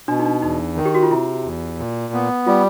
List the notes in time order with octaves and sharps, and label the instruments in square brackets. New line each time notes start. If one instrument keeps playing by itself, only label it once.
[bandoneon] B2 [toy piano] D4
[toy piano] D#4
D4
[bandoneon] E2 [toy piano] D#4
[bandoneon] D#3
[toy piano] G4
F#4
F4
[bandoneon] C3 [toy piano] E4
[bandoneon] E2
A#2
B3
[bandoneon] G3 [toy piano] F4